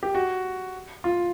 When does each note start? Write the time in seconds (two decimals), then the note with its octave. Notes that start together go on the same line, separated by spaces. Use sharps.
0.03 G4
0.15 F#4
1.04 F4